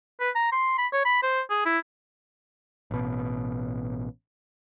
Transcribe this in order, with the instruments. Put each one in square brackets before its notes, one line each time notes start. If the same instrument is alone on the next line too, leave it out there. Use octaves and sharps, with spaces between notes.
[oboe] B4
A#5
C6
B5
C#5
B5
C5
G#4
E4
[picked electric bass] A1 B2